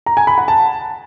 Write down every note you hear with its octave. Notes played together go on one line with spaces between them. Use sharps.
A#5
G#5
B5
F#5
A5